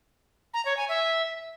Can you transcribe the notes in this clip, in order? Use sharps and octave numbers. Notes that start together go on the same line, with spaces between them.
A#5
C#5
G#5
E5